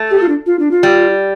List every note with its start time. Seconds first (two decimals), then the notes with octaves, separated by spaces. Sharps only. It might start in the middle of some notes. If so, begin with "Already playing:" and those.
Already playing: A3
0.11 G4
0.21 F4
0.29 D4
0.46 F4
0.59 D4
0.71 F4
0.83 G3